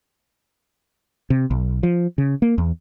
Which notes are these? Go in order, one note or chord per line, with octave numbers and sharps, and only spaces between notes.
C3
B1
F3
C#3
A#3
E2